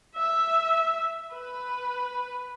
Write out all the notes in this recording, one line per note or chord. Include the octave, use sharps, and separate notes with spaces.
E5
B4